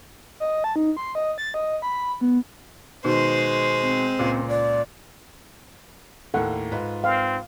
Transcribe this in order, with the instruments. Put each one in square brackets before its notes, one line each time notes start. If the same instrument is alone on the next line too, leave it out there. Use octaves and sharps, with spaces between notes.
[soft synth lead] D#5
A5
D#4
C6
D#5
A6
D#5
B5
B3
[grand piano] B2 D#3 [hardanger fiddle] G#3 C5
[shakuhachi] C4
[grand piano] C#2 A#2
[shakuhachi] D5
[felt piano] D#2 A2 A#3 [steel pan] A4 F#5
[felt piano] G#2 F4 B4
[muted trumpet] C4 [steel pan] F5